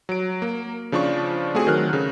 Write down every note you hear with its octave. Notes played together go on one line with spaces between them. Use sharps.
F#3 D7
A#3
C#3 F3 D4 F4 C#6
A3 C4 F#4 G#4
D#3 F#3 A#4 F6 F#6
C#3